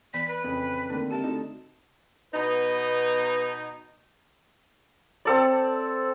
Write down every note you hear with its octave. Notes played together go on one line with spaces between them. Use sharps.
E3 B3 D5 B6
B4
F2 C#3
D3 D#3 A#3 C4
G#3 C4 G4 A5
D3 A3 D#4 F#4
B2 B3 D#4 B4
C4 A4 D5